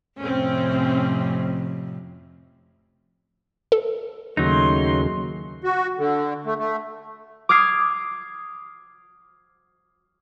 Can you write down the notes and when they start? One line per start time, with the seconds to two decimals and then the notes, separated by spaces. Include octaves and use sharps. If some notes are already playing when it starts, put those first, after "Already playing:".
0.19 F2 A2 C3 C4 C#4
3.72 A4
4.37 D#2 C#3 F#3 A3 D#4 C6
5.64 F#4
5.98 D3
6.45 A3
6.59 A3
7.49 D6 D#6 F6 G#6 C7